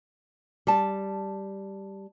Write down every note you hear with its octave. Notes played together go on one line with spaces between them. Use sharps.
G3 A5